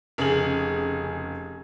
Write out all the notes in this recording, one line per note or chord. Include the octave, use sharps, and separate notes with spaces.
F1 C#3 G#4 F#7